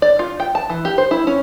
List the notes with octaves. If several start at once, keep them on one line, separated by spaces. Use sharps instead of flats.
D5
F4
G5
A5
E3
G4
C5
E4
C#4